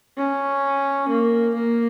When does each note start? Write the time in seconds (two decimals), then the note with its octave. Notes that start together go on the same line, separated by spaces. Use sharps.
0.17 C#4
1.09 A#3
1.55 A#3